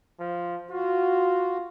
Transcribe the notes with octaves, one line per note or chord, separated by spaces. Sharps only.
F3
F4 F#4